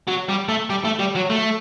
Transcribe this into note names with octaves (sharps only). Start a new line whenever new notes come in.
F#3
G3
A3
G3
A3
G3
F#3
A3